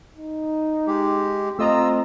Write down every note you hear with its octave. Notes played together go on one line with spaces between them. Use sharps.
D#4
G#3 G4
A3 C4 F4 D#5 A#5 E6